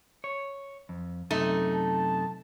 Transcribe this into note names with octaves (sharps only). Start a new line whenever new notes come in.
C#5
F2
F#2 C3 A3 D#4
A5